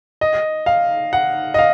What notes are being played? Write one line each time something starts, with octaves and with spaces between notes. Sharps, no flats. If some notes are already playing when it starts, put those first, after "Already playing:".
D#5
F5
F#5
D#5
F5